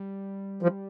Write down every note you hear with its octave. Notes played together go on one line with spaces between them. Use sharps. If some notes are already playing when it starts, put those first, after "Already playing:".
Already playing: G3
F3